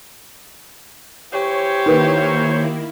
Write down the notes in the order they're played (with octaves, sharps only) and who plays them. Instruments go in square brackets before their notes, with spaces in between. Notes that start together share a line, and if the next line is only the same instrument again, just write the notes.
[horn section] E3 C5 C#5 [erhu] G4
[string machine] D#3 A#3 E4 [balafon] D#4 A#4 B4